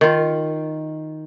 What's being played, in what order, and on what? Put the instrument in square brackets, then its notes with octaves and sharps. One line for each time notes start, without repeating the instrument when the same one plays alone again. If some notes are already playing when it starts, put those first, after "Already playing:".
[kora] D#3 F4